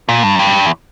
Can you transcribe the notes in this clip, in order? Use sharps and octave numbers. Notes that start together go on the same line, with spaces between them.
A#2
G2
F#2
G2
E2